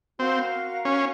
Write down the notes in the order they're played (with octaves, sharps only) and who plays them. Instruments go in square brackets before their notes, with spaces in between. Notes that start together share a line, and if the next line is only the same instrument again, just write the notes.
[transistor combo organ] C4 [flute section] F#4 A#4 F5
[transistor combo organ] C#4